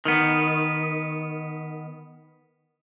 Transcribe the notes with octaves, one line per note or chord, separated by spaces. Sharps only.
D#3 B3